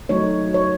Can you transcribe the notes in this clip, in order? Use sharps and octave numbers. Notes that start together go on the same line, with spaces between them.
F#3 A3 D#4 C#5
C#5